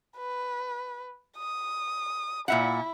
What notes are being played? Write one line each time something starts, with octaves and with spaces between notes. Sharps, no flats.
B4
D#6
A#2 E4 E5 F#5